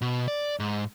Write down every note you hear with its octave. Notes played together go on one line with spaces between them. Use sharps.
B2
D5
G#2